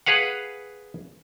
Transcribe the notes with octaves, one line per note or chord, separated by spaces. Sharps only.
G#4 B4 F5 F#5